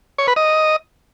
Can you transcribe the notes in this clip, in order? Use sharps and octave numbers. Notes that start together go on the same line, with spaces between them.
C#5
B4
D#5